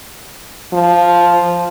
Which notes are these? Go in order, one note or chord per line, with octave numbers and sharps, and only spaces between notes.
F3